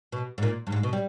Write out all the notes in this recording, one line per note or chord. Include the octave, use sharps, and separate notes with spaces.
B2
G#2
A#2
G2
G#2
B2
G3